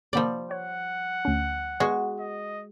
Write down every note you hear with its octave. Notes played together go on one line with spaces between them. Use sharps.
C3 F3 G3 A#3 D5
C#5 F#5
D2 C#4
G#3 B3 F#4
D#5